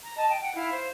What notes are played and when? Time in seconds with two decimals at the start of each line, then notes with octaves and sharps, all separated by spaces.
0.02 A#5
0.16 D#5 A5
0.29 G5
0.40 F#5 G5
0.55 E4 F5
0.72 C5